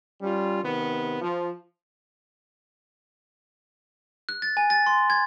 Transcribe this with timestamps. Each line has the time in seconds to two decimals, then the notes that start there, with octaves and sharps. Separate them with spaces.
0.21 G3 C#4 F4
0.64 C3 D#3 B3
1.21 F3
4.29 F#6
4.42 A6
4.57 G#5
4.70 A6
4.86 C6
5.10 G#6